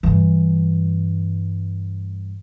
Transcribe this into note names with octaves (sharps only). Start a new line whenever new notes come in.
G2 E3